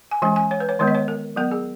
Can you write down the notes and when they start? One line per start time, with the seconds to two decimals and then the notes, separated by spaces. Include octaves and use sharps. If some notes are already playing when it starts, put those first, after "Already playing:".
0.11 G#5
0.22 E3 G#3 C#4 G#5
0.36 G#5
0.51 C#5
0.60 B4
0.69 C#5
0.79 D#3 G#3 B3 C#5
0.88 D#5
0.95 C#5
1.08 A#4
1.36 F#3 B3 A#4
1.51 G#4